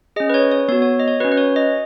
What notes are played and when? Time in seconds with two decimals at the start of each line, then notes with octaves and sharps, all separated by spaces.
0.16 G#4 D#5
0.20 C#4
0.29 B4
0.34 C#5
0.52 C#5
0.68 B3 C#5
0.72 F#4
0.82 C#5
1.00 D#5
1.08 C#5
1.20 F#4 B4
1.24 C#4
1.32 B4
1.37 C#5
1.56 D#5